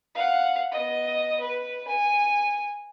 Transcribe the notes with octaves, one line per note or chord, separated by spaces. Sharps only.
F5 F#5
B3 D#5
B4
G#5